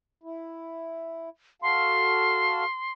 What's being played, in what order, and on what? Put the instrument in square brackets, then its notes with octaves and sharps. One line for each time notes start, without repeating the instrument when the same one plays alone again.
[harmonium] E4
[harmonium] F#4 A4 F5 [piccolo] C6